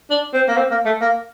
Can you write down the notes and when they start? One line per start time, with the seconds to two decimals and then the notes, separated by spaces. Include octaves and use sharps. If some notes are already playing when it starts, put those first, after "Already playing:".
0.11 D4
0.34 C4
0.48 A#3
0.57 C4
0.71 A#3
0.86 A3
1.01 A#3